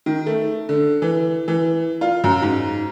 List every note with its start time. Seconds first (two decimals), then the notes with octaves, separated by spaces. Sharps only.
0.06 D#3
0.26 A3
0.69 D3
1.02 E3
1.48 E3
2.01 F4
2.24 F#2
2.42 G#2